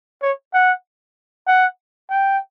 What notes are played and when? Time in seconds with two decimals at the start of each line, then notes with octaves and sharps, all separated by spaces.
0.22 C#5
0.54 F#5
1.47 F#5
2.10 G5